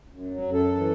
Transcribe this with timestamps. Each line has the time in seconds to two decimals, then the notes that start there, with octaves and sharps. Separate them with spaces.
0.08 F#2
0.30 F#3
0.42 F#2
0.53 A4
0.75 E3